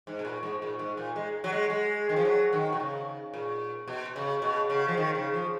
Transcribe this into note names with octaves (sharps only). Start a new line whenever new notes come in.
G#2
B2
A#2
G#2
A#2
G#2
A#2
G#3
F#3
G#3
G#3
D#3
F3
F#3
D#3
B2
C#3
A#2
B2
C#3
B2
C#3
F3
D#3
C#3
F3